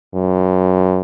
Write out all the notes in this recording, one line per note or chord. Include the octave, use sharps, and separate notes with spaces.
F#2